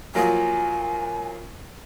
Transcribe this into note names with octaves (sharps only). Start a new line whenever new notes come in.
F3 F#3 A#3 G#5